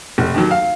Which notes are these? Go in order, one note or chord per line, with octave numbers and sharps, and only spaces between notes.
F1
D#2 D#3 F#3
F5